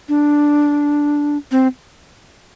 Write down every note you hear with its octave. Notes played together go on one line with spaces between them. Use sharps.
D4
C4